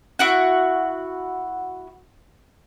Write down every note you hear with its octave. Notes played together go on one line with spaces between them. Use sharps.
E4 F#4 F#5